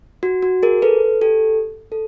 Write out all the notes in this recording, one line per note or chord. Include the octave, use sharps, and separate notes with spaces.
F#4
F#4
G#4 A#4
A4 B4
G4 A4
A4